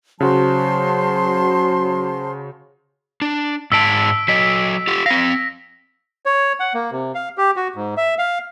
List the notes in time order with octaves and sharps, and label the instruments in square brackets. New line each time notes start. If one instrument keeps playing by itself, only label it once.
[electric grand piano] C#3 F#4 [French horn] F#3 [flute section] C5 A5 C6
[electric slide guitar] D4
[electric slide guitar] G#2 G#3 A5 [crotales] E6 B6 D7
[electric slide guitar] F#3 D#5 [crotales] B6
[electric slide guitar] F4 G4
[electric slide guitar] C4 F5 [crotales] A#6
[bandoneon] C#5
F#5
A#3
C3
F5
G4
F#4
G#2
E5
F5